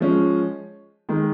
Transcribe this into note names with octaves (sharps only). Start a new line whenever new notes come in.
F3 G#3 C#4
D#3 G#3